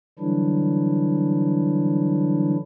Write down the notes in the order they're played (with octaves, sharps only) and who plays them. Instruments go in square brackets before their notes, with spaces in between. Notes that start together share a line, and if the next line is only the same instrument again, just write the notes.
[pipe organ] D3 E3 F#3 G3 D4 E4